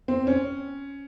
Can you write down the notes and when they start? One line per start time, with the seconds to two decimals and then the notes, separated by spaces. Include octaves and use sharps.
0.08 C4
0.27 C#4